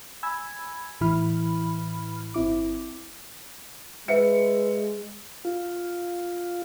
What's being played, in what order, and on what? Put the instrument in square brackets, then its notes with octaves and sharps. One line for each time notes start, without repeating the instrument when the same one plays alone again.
[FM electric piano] G#5 B5 E6 G#6
A1 A2 E3 E4 B5 F6
G1 C4 E4 D6
[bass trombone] G#3 [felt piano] B4 E5 C#7
[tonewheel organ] F4